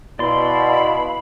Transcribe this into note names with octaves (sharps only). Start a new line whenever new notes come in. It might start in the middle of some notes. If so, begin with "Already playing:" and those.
B2 E4 D5 F5 B5 C6